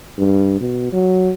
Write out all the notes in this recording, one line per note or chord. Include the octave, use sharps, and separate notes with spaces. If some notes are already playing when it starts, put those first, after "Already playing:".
G2
B2
F#3